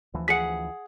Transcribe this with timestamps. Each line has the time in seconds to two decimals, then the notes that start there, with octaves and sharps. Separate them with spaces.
0.14 D2 E3 F3
0.28 G#4 F#5 B6 C#7